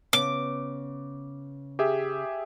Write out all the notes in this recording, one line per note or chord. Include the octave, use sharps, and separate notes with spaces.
C#3 B3 D6
G4 G#4 E5